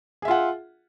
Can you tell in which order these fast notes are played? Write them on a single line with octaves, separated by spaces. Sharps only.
G#4 E5 F4 F#5